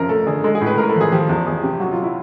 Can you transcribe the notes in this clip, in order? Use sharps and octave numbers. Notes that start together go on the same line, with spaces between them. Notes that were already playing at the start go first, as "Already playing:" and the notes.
Already playing: F#2 C3 F3 A#4
A3 A4
D3 G#4
G#3 A4
G#4
A2
B4
A2 A#4
A4
F3
G#4
F3 G4
E2
E2 G#4
C3 G4
F#3 F#4
F4
E4